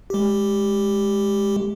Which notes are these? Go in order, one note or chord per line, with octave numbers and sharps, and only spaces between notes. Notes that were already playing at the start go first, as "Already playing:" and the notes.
G#3 G4